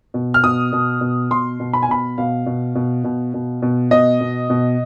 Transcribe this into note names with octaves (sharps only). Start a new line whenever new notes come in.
B2
F6
B2 D#6
B2
B2
B2 C6
B2
B5
G#5
B2 B5
B2 F5
B2
B2
B2
B2
B2
B2 D#5
B2
B2